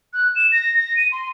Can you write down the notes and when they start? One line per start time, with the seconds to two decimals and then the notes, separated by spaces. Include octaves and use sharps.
0.14 F#6
0.36 E7
0.52 A#6
0.78 A#6
0.97 D#7
1.12 C6